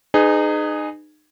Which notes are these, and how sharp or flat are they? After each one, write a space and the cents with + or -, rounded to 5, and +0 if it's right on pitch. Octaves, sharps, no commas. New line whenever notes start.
D#4 -30 G#4 +0 B4 +25